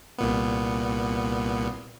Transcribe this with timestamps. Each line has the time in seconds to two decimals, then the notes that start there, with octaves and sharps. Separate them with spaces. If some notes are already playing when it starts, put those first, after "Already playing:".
0.18 C2 A#2 B3